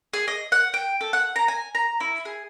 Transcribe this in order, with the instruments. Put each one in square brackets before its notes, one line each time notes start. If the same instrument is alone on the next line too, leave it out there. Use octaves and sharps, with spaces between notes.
[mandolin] G#4
D#5
F#5
G5
A4
F#5
A#5
G#5
A#5
E4
G#4